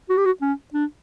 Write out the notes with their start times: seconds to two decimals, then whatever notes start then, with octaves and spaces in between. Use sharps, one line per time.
0.09 F#4
0.17 G4
0.25 F#4
0.42 C#4
0.74 D4